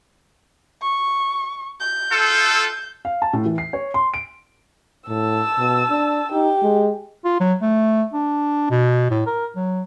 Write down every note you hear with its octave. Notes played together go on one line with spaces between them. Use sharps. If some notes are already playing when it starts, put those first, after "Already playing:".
C#6
G6
F4 A4
F5
A5
A2
E3
C7
C#5
C6
D7
A2 A5 E6
B2
D4
D#4 G4
G#3
F4
F#3
A3
D4
B2
A2
A#4
F#3